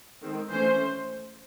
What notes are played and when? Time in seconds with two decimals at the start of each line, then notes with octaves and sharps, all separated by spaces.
0.22 D#3 G#3 C4
0.51 E3 A3 C#4 C5